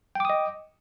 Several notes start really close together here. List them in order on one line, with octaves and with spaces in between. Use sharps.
G5 D6 D#6 D#5